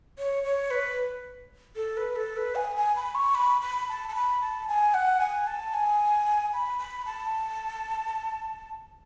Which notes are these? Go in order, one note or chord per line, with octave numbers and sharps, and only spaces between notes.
C#5
C#5
B4
A4
B4
A4
B4
G#5
G#5
B5
C#6
B5
B5
A5
A5
B5
A5
G#5
F#5
G#5
A5
G#5
B5
B5
A5